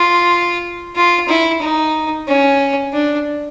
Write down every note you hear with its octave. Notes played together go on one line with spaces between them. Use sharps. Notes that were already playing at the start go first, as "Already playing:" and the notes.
Already playing: F4
F4
E4
D#4
C#4
D4